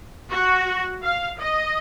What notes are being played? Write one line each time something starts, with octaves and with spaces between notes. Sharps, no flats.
F#4
F5
D#5